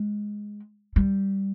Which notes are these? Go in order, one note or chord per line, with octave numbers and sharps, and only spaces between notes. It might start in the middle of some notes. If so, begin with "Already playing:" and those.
Already playing: G#3
G3